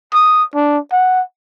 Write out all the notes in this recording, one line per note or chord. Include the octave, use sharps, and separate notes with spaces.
D#6
D4
F#5